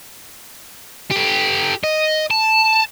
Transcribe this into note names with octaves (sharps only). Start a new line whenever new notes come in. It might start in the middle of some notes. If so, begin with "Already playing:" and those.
G4 A4
D#5
A5